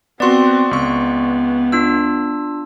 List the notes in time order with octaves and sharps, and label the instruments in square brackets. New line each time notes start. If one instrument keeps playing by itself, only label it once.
[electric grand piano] B3 F#4 [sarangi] C4 [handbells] D5 C6
[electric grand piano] C#2 C#6 [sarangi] B3
[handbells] D4 F4 E6